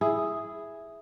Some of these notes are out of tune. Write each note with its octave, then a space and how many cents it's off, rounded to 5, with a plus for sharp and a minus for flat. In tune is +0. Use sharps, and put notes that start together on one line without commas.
E4 +0 G#4 +0